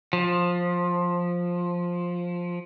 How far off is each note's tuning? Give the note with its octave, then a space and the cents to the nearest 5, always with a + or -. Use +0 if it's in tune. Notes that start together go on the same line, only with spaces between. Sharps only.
F3 +10